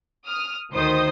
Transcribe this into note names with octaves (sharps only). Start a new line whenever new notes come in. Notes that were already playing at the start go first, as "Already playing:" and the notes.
D#6 F6
D2 D#3 C5 D#6